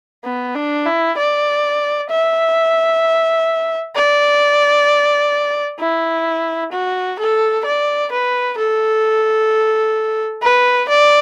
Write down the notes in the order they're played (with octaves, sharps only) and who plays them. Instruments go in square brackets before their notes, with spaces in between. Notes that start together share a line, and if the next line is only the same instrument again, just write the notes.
[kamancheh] B3
D4
E4
D5
E5
D5
E4
F#4
A4
D5
B4
A4
B4
D5